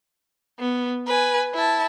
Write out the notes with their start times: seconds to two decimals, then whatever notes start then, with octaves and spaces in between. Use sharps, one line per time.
0.60 B3
1.07 B4 G#5
1.55 E4 A5